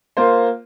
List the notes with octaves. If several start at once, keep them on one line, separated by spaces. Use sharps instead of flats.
A#3 F4 C5